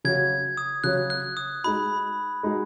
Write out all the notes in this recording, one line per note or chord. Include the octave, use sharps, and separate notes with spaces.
C#3 F#3 C#4 F#4 G#6
D#6
C#3 F#3 C#4 F#4 F#6
F#6
D#6
G#3 D#4 F#4 B5
G#3 D#4 F#4